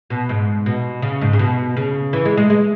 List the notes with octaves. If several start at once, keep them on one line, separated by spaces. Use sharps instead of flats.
B2
G#2
B2
C#3
G#2
C#3
B2
C#3
E3
G#3
G#3
G#3